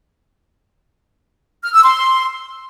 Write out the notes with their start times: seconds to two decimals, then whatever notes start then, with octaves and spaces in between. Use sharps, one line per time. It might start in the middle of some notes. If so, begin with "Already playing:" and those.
1.63 F6
1.73 E6
1.83 C6